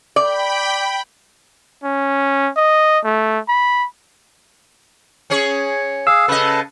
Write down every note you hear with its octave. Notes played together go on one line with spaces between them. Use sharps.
D5 G5 B5
C#4
D#5
A3
B5
C#4 G#4 C#5
G#4 F5 E6
C#3 A4 B4 D#5 A5